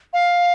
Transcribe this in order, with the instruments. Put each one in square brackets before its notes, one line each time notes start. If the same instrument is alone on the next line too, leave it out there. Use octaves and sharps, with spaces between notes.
[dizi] F5